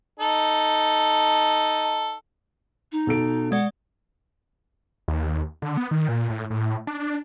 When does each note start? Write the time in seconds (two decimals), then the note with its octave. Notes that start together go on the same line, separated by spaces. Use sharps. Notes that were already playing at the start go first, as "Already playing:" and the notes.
0.20 D#4 A4
2.92 D#4
3.07 B2 A4 D7
3.52 G#3 D5 F#5
5.08 D#2
5.62 D3
5.77 B3
5.91 D#3
6.09 A#2
6.30 A2
6.50 A2
6.87 D4